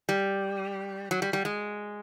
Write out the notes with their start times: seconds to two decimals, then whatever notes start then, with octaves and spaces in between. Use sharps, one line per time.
0.09 G3
1.11 F#3
1.22 G3
1.33 G3
1.45 G#3